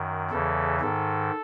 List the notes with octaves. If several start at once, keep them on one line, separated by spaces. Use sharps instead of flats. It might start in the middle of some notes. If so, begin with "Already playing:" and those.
Already playing: F#2 D#3
E2 C#3 E3 A4
G#2 D#3 A4